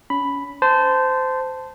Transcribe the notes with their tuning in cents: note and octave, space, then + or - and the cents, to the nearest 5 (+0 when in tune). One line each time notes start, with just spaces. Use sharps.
C#4 +25 B5 +0
C5 -20 A5 +0